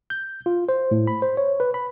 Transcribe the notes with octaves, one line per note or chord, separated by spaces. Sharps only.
G6
F4
C5
A2
B5
C5
C#5
B4
B5